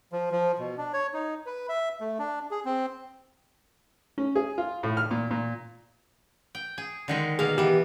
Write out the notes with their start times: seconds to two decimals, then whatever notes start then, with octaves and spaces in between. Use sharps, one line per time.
0.12 F3
0.32 F3
0.59 B2
0.78 D4
0.93 C#5
1.14 D#4
1.46 B4
1.69 E5
2.01 A3
2.19 D4
2.51 G#4
2.65 C4
4.18 C#4
4.35 G#4
4.58 F4
4.83 A2
4.97 F6
5.11 A#2
5.31 A#2
6.55 G5
6.78 G#4
7.08 D3 D#3 G#3
7.39 B2 A#3 G#4 F5
7.58 E3 B3 G4